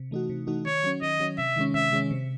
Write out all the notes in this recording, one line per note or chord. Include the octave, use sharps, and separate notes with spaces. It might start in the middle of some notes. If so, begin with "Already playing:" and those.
Already playing: C3
E3 A3 D#4 F#4
C3
E3 A3 D#4 F#4
D#3 C#5
F#3 C#4
D#3 D#5
F#3 C#4
C3 E5
D#3 G#3 C#4
C3 E5
D#3 G#3 C#4
C3